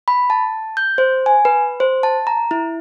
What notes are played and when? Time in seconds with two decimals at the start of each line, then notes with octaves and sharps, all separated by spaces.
0.08 B5
0.30 A5
0.77 G6
0.98 C5
1.26 G#5
1.45 B4
1.80 C5
2.03 A5
2.27 A#5
2.51 E4